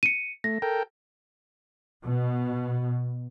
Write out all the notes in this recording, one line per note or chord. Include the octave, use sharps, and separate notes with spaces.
C#7 D#7
A3 A#6
A4 A#4 G5
B2